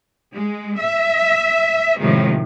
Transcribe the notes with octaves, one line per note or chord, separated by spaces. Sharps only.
G#3
E5
A2 C3 D#3 F3 G#3